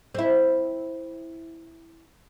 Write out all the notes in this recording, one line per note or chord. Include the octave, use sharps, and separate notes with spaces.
C4 E4